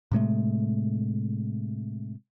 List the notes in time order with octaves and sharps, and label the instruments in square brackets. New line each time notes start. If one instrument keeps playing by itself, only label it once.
[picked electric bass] A2 C3 G#3 A3